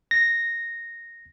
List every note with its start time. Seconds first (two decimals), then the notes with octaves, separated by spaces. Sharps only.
0.11 A#6